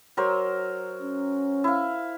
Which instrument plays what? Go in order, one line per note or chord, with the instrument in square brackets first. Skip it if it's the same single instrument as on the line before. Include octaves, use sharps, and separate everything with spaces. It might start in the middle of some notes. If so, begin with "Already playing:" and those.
[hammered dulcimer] F#3 A#4 C5
[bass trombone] C#4
[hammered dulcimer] E4 F5